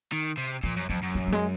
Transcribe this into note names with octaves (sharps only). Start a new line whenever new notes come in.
D#3
C3
A#2 F3
F#2
F2 F#3
F#2
F#3
F#3
G#3